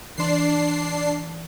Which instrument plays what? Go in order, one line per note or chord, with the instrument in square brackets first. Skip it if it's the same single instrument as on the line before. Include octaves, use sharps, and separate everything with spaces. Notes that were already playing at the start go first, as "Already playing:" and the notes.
[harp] E3 C6 [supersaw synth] D4 C7